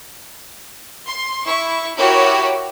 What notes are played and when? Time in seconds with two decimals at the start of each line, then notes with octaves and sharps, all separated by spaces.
1.07 C6
1.45 E4 C#6
1.96 E4 F#4 G4 A#4 C#5